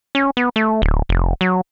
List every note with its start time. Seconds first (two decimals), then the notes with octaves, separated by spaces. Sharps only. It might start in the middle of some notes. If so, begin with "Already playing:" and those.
0.15 C#4
0.37 B3
0.56 A3
0.82 D1
1.09 F1
1.41 F#3